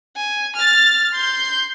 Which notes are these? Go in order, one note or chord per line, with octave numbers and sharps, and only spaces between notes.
G#5
F6 A6
C6 G6